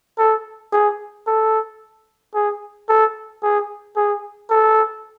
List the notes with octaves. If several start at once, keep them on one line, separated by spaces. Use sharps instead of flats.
A4
G#4
A4
G#4
A4
G#4
G#4
A4